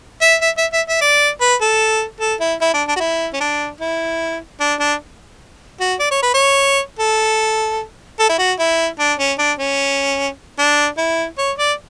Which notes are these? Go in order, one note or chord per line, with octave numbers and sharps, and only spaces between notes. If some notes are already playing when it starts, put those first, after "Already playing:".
E5
E5
E5
E5
E5
D5
B4
A4
A4
E4
E4
D4
D4
F#4
E4
C#4
D4
E4
D4
D4
F#4
D5
C#5
B4
C#5
A4
A4
E4
F#4
E4
D4
C#4
D4
C#4
D4
E4
C#5
D5